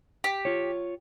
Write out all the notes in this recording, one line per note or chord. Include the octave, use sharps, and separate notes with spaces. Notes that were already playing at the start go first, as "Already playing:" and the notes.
G4
F4 C#5